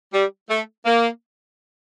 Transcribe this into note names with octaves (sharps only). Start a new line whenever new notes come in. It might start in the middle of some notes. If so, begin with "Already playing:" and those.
G3
A3
A#3